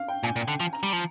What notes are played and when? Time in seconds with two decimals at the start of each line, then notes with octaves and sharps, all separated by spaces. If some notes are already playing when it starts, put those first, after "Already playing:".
Already playing: F5
0.08 G5
0.23 A#2 G#5
0.36 A#2
0.48 D3
0.60 F3
0.73 A#5
0.83 G3
0.93 F3